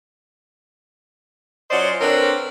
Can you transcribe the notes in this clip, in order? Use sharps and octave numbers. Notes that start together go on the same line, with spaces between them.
F#3 C#4 F4 C5 D5 D#5
D3 C4 D4 A#4 B4 C#5